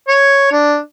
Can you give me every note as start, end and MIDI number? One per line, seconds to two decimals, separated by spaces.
0.08 0.49 73
0.52 0.78 62